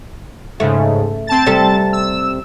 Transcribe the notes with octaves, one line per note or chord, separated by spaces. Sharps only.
G#2 C#3 A3
C4 A5 A6
C3 G3 A4
E6